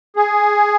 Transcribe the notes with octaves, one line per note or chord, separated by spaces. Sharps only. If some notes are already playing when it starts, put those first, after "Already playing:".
G#4